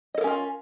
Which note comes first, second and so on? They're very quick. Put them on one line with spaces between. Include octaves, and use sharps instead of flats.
D#5 A4 A#4 C#4 F4